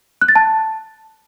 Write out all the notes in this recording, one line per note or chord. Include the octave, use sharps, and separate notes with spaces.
F#6
A6
A5